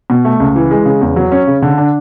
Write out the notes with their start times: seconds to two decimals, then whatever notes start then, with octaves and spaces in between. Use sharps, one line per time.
0.10 B2
0.25 A3
0.40 C#2
0.56 E3
0.71 G#3
0.85 C#3
1.01 E2
1.16 F#3
1.32 C#4
1.47 C#3
1.62 D3
1.78 D4